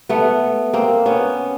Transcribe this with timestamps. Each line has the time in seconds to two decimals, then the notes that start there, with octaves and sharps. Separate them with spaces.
0.09 A3 B3
0.73 A#3 C4
1.06 B3 C#4